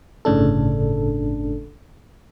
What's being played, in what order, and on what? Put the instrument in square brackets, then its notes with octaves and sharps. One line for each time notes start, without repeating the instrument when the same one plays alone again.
[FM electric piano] G1 A2 C#3 D4 A4